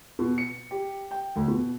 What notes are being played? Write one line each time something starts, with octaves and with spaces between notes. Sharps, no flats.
B2
C#7
G4
G5
D2
B2